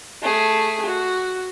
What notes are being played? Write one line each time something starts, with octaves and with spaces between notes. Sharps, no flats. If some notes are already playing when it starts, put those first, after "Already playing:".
A3 G#4
F#4